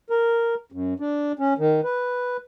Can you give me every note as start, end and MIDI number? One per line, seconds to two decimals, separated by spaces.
0.10 0.55 70
0.72 0.94 42
1.00 1.32 62
1.39 1.54 61
1.58 1.81 51
1.84 2.37 71